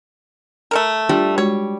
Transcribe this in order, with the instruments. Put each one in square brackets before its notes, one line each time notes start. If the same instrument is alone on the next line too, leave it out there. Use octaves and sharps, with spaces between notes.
[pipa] A3 A4 A#4
[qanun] G3 [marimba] D4 F4
[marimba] G#3 F#4 [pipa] C#5